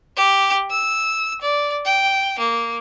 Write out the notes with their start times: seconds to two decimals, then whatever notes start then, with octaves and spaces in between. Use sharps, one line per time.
0.16 G4
0.71 E6
1.42 D5
1.86 G5
2.39 A#3